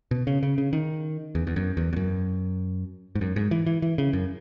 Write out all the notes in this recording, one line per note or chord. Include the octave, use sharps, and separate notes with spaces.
B2
C#3
C#3
C#3
D#3
E2
E2
F#2
E2
E2
F#2
G#2
F#2
G#2
E3
E3
E3
C#3
F#2